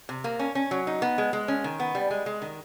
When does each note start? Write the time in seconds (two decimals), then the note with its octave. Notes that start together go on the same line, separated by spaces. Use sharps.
0.09 C3
0.24 A#3
0.39 C#4
0.55 C#4
0.71 F#3
0.87 D#4
1.02 B3
1.18 G#3
1.33 G#3
1.48 C#4
1.64 D#3
1.80 B3
1.95 G3
2.10 G#3
2.26 G#3
2.42 D#3